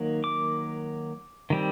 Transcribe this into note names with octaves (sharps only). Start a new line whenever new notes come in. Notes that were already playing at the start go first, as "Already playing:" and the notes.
Already playing: D#3 F#3 A#3
D6
D#3 G3 C4